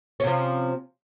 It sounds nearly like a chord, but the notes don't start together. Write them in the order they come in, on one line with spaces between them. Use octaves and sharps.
C#4 C3 F3